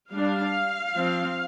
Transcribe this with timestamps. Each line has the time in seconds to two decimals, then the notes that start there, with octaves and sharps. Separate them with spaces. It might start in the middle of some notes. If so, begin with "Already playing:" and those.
0.13 G3 D4 F5
0.95 F3 C4